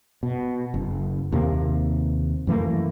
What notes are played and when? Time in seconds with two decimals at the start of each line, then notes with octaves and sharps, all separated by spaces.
0.23 B2
0.74 F#1
1.32 D#2 C3 A#3
2.47 F#2 E3 A3 A#3